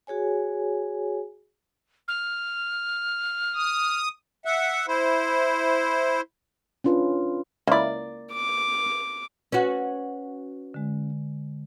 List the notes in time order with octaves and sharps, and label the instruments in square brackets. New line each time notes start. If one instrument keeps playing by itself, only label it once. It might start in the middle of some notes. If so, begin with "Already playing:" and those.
[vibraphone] F#4 G#4 C#5 G#5
[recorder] F6
[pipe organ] D#6
[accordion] E5 F#5
E4 C5
[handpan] C#4 D4 F4 B4
[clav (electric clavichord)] C#2 E4 [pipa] A#3 D5
[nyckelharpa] D6
[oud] C#4 F#4 [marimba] B4
[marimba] D3 G#3